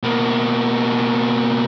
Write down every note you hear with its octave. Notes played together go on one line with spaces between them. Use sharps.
B2 A#3